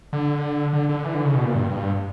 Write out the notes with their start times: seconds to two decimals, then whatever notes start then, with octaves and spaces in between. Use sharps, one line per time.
0.13 D3
0.73 D3
0.89 D3
1.04 E3
1.15 D3
1.25 C#3
1.35 B2
1.45 A#2
1.54 G2